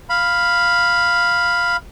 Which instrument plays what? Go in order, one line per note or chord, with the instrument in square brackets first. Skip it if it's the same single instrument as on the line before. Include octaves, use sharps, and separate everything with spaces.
[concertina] F5 B5